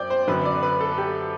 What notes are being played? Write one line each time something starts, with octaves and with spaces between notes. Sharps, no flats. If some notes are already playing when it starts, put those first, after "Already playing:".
Already playing: F#2 C5 D5 G5
C5
F#2 D3 B4
D5
B4
A4
G4